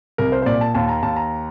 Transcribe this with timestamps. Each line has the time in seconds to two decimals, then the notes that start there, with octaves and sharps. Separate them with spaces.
0.18 C2 A#4
0.32 C5
0.42 C5
0.46 A#2 D5
0.61 A5
0.74 D#2 A5
0.89 A#5
1.02 D#2 A5
1.16 A#5